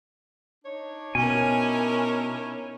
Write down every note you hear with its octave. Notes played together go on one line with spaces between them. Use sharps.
D4 D#4 C#5
B2 C#4 E4 A#4 G#5